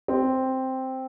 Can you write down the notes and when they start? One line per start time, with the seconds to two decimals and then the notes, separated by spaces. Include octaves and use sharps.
0.08 C4